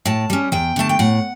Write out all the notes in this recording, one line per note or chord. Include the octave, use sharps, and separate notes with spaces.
A2 A5
G3 C#4
E2 G5
D3 A3 A5
G5
A2 F#5